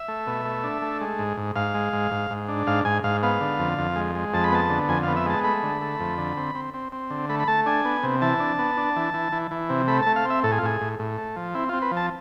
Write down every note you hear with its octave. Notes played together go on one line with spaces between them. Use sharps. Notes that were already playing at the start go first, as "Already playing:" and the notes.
Already playing: E5
A3
B2
A3
D4
A3
G#3
G#2
G#2
G#2 F5
G#3
G#2
G#2
G#2
D4
G#2 F5
G#2 G#5
G#2 F5
B3 F5
D3
F2
F2
G#3
G#3
F2 A5
B5
B3 A5
D3
F2 G#5
B3 F5
E5
G#3 A5
A3 B5
D3
A3
F2
D3
C4
C4
C4
C4
D3
A3 B5
B5
A3 A5
D4 G#5
B3
C3
E3 A5
D4
B3
D4
E3
E3
E3
E3
C3
A3 B5
A3 A5
F5
C4 E5
A2 A4
G#4
F4
A2 G#4
A2
A2
A3
F3
C4 E4
C4 F4
B4
F3
A5